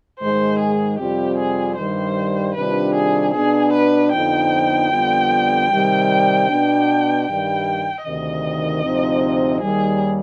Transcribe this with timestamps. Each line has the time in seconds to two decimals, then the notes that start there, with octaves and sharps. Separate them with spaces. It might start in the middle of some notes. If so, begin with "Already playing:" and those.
0.19 G#2 D#3 G#3 C5
0.59 G#4
0.98 F2 C3 G3 C4 F4 G4
1.37 G#4
1.76 G2 D#3 G3 C5
2.55 C3 D#3 G3 D4 F4 B4
2.94 G#4
3.33 B2 B3 D4 G#4
3.72 B4
4.12 F2 D3 F3 B3 D#4 G5
4.90 F2 D3 G3 B3 F4
5.69 C3 D#3 G3
6.47 B2 B3 D4
7.26 G2 D#3 G3 G5
8.04 D2 C3 D#3 D#5
8.83 D2 C3 F3 C4 D#4
9.61 D#2 D#3 G3 G#4